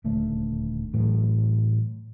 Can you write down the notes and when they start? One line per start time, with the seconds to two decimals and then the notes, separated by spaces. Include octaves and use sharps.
0.04 D#1 D2 A3
0.94 A2 E3 F#3